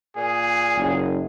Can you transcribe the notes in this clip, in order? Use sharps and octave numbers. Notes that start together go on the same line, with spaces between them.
A#2 G#4
F#1